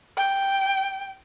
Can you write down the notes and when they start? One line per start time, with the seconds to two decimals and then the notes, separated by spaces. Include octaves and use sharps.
0.17 G5